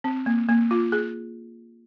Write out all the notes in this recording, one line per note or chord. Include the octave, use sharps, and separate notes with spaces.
C4
A#3
A#3
F4
G#4